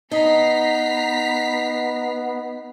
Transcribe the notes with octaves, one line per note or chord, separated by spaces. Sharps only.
B3 D#4 A#5 B6 C7